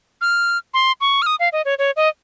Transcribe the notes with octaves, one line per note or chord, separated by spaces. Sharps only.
F6
C6
C#6
F6
D#6
F5
D#5
C#5
C#5
D#5